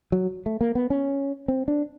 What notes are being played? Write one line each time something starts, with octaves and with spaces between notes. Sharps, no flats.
F#3
A3
A#3
B3
C#4
C4
D4